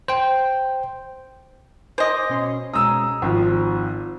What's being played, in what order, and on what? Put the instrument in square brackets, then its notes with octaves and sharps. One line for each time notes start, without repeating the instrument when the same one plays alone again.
[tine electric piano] C5 G5
[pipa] C5 D#5 [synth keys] G#5 D6 G#6
[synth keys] B2 C#4 C6
[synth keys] B2 G#3 C#4 [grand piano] A#5 E6 [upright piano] D#6
[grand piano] G#1 [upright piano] F3 [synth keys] F4